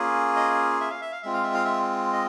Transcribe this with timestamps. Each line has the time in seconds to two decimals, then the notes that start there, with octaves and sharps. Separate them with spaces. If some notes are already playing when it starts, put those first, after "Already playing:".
Already playing: A#3 C#4 F4 G#4
0.36 D#5
0.81 E5
0.90 F5
1.01 E5
1.12 F5
1.22 G#3 C4 F4 E5
1.33 F5
1.43 E5
1.54 F5
1.65 E5
2.13 D#5